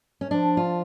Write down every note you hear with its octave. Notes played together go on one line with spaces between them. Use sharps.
C#4
F3 D4
F4